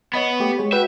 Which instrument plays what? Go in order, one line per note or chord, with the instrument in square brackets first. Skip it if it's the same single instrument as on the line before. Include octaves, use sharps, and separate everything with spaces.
[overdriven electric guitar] B3 [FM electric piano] C#5 D#5 B5
[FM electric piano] A3 G4
G#3 C#5
[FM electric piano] F#4 B4 G5 [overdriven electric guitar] E5